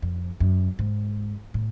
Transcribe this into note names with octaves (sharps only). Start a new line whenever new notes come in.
F2
F#2
G#2
A2